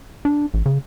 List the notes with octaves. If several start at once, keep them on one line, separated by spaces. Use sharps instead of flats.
D4
A1
C#3